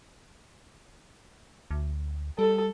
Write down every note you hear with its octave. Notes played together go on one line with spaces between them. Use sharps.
D2
G3 A4